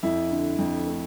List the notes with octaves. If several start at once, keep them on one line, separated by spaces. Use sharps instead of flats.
F2 E4
D3
F2
A3